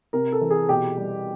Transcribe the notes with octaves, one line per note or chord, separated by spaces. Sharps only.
C3 A#4
A4
E3
G#4
B2 G4
G3